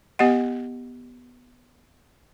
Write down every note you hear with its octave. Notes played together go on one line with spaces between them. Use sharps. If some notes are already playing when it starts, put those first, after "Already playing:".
B3 G4 D#5 F#5